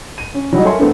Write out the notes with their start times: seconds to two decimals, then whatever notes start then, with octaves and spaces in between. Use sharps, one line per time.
0.18 D#7
0.34 C#4
0.53 F#3 G3 D#4
0.64 A4 A#4 C#5 E5 G#5 C6
0.79 G2 A3 B3 C4